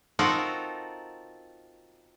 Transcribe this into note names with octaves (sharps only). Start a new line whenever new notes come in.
C4 D#4 F4 F#4 A4 A#4